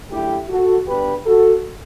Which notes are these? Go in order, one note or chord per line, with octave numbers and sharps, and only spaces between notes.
F#2 D3 A3 E4 G4
F#4 A4
G2 D3 G3 B3 G4 B4
F#4 A4